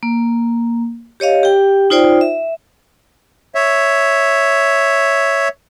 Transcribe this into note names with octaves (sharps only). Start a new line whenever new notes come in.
A#3
G4 C#5 D#5 F5
G4 G5
D#4 F4 C5 D5 G5
E5
C#5 E5